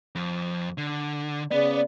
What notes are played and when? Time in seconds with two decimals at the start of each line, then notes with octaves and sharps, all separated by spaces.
0.15 F2
0.78 D3
1.51 C#3 B3 D5